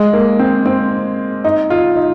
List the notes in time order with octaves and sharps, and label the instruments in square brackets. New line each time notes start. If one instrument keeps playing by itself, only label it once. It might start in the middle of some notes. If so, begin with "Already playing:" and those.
Already playing: [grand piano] G#3
A#3
C4
C4
D#4
F4
D#4